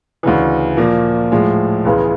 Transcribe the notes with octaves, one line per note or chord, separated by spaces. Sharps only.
D2 C#3 E3
A#2 F3 A#3
A2 F3 G#3
C#2 C#3 E3 G#3 B3